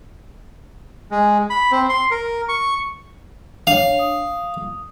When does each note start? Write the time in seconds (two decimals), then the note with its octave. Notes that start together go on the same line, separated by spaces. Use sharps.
1.11 G#3
1.50 B5
1.72 C4
1.89 C6
2.11 A#4
2.49 C#6
3.67 D4 C#5 F5
3.99 D#6